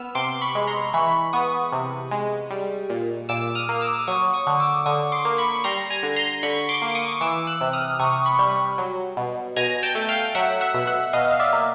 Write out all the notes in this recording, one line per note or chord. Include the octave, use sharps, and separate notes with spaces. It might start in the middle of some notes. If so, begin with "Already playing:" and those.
Already playing: B3 E6 F6
C3 C6 D6
B5 C#6
G#3
A#5 C6
E3 B5 C#6
B3 C#6 D#6
C3
G#3
G3
A#2
A#2 D6 E6
D#6 F6
A#3
D6 E6
F#3 C#6 D#6
C#6 D#6
D3
D6 E6
D3 C#6 D#6
C6 D6
A#3
B5 C#6
G3 A#5 C6
G#5 A#5
D3
A#5 C6
D3 B5 C#6
C6 D6
A#3
D6
C#6 D#6
E3 D6 E6
E6 F#6
C3
D#6 F6
C3 C#6 D#6
B5 C#6
G3
F#3
B2
B2 G#5 A#5
G5 A5
A3
F5 G5
F#3 E5 F#5
E5 F#5
B2
E5 F#5
B2 D#5 F5
F5
D5 E5
A#3